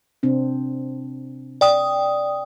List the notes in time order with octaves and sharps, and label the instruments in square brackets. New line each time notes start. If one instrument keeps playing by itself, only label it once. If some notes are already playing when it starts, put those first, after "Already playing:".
[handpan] C3 C4 D4
[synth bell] D5 G5 D#6